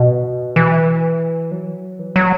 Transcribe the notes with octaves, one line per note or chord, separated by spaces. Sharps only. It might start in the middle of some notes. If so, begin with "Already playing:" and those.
Already playing: B2
E3
F#3
E3
F#3